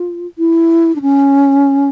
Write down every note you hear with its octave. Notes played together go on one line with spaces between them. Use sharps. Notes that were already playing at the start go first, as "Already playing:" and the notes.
Already playing: F4
E4
D4
C#4